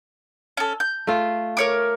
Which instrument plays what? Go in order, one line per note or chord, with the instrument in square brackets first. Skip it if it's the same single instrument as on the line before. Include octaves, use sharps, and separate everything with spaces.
[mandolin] C#4 A4
G6
[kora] A3 F4
[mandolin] A#4 C#5 D6